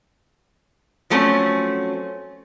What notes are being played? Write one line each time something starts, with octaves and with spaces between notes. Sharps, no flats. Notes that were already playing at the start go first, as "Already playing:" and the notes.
F3 F#3 A3 C4 C#4